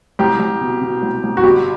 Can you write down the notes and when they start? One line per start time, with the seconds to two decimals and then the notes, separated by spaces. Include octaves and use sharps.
0.19 C2 G4
0.39 C2
0.61 B2
0.81 B2
1.02 C2
1.23 C2
1.37 F#4
1.43 G1 G4